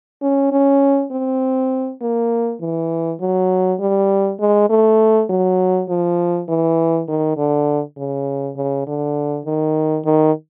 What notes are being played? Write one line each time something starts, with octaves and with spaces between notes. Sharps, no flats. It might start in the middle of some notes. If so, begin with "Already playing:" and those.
C#4
C#4
C4
A#3
E3
F#3
G3
G#3
A3
F#3
F3
E3
D#3
D3
C#3
C#3
D3
D#3
D#3